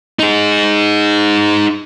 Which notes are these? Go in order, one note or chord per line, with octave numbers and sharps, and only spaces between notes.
D#4 G#4